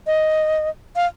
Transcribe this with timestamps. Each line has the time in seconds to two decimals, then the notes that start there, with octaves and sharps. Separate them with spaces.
0.07 D#5
0.96 F5